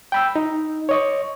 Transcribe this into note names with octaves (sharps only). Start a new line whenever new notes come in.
G5 B5 E6
D#4
C#5 D#5 C#6